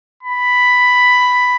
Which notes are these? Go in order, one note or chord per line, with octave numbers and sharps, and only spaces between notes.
B5